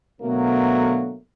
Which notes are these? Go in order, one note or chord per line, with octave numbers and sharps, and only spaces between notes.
B2 D3 F#3 A3 A#3